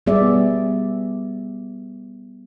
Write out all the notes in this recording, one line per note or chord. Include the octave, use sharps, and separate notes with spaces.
G3 B3 G#4 D5 E5